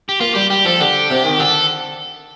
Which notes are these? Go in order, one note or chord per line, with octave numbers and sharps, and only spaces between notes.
G4
A#3 F4
G3 G4
G3 G4
F3 A4
D3 G4
C3
D#3
D3 A4